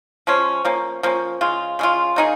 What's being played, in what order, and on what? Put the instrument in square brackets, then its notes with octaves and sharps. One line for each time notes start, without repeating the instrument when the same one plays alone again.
[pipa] F3 G#3 C#4
F3 A#3 C#4
F3 A#3 C#4
C#3 G#3 F4
C#3 G#3 F4
C#3 A#3 D#4 G#4